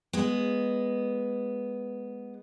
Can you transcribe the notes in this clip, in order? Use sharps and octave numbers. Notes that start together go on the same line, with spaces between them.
G#3 B3